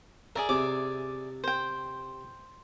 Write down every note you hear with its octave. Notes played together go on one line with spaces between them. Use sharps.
G#4 A#4 D5 E5
C3 D6
C5 G5